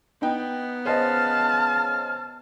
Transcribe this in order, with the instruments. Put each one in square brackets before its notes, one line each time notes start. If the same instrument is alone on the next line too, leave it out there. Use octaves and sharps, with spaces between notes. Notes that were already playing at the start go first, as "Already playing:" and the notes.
[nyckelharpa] B3 [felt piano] D#4 G5
[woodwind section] C#3 F6 [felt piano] C5 D#5 [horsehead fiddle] A5